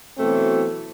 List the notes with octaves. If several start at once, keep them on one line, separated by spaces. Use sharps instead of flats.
B2 E3 F#3 A3 C4